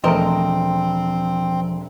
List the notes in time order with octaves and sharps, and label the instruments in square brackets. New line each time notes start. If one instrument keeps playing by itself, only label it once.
[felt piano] E1 A3 D7 [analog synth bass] F3 [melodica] C4 [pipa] A#4 C5 D#5